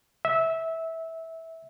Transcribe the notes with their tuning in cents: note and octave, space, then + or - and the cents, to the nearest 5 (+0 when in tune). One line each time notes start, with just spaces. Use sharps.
E5 -15